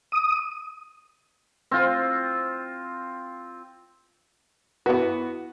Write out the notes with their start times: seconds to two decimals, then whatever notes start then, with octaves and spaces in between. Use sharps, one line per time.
0.12 D#6
1.71 C4 F4
4.86 E3 B3 F#4 B4